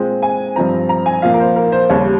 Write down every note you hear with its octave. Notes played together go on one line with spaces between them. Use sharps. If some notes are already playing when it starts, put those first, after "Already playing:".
Already playing: A#2 G#3 C4 G5
G#5
G2 F3 C4 A#5
A#5
G#5
A#2 F3 A#3 F5
A#4
C5
A#4
C5
D#2 C#3 G3 C#5